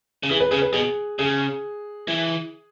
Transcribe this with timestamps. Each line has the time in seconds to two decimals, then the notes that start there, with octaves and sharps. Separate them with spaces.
0.23 C#3
0.29 E3 G#4
0.40 B4
0.51 C#3 G#4
0.62 B4
0.72 B2 G#4
1.19 C#3 G#4
2.08 E3